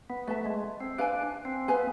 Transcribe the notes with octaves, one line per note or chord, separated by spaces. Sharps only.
B3
A3 B4 E5 A5
G#3
C4
D4 B4 F5 G#5
C4
B3 B4 F5 G#5